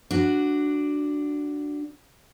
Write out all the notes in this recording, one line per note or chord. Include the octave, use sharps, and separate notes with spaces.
D4 F#4